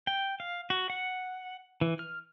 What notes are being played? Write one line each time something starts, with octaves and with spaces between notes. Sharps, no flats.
G5
F5
F#4
F#5
E3
F6